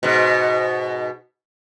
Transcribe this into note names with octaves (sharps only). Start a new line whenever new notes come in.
G#2 B2